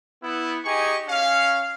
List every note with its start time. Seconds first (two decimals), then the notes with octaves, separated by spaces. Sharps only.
0.24 B3 E4
0.65 D#4 G4 G#4 D#5 G#5 C#6
1.08 C#4 F5